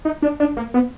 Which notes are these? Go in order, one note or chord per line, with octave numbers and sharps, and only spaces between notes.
D#4
D4
D4
A#3
B3